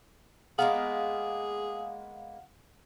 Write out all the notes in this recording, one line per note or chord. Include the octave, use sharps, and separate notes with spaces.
G#3 A#3 B3 G#4 F5 F#5